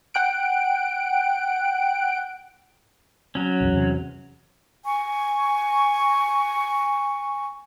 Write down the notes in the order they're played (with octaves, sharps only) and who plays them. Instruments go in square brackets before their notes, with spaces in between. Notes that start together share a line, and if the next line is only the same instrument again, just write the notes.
[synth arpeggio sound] F#5 G5 F#6 D7
[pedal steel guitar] F#3 C#4
[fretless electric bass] A#1 E2
E2 C3
[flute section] G#5 C#6